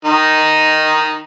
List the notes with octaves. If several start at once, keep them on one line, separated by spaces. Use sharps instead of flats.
D#3 D#4